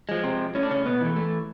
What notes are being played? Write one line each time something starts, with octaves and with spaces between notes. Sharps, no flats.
F3 G#3
C3 C4
A2 C#4
D4
C#3 C#4
B2 B3
E3 A3
A3